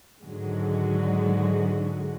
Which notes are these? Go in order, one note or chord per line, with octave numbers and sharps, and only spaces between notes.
G#2 D3 D#3 F#3 G#3 F#4